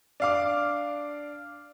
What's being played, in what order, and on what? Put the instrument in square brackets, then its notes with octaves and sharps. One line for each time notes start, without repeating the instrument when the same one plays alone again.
[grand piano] D4 F5 D6